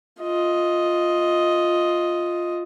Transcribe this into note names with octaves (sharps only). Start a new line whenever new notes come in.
F4 D#5